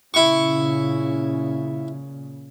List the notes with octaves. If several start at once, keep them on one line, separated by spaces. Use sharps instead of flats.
A#2 C#3 E4 C#6